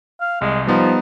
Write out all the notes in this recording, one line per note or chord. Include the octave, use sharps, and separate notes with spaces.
F5
C2 G#3
F3 G3 B3 D#4